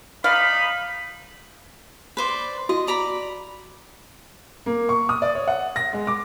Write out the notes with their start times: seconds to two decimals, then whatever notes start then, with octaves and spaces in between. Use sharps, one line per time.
0.24 D#4 D5 F5 B5
2.17 B4 C5 D5
2.69 F#4 D#5
2.87 D5 A#5 B5
4.66 A#3
4.89 C#6
5.09 D#6
5.22 D5
5.35 C#5
5.48 F#5
5.76 A#6
5.93 G#3
6.07 D6